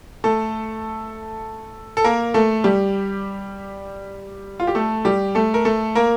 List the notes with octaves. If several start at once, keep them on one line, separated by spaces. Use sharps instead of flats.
A3 A4
A4
A#3 A#4
A3 A4
G3 G4
F4
G4
A3 A4
G3 G4
A3 A4
A#4
A3 A4
A#3 A#4